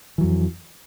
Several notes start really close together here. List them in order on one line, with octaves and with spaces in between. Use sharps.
E3 F#3 F2